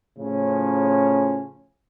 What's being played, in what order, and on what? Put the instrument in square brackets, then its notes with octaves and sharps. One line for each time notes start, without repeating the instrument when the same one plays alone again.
[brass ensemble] A2 C#3 F3 C#4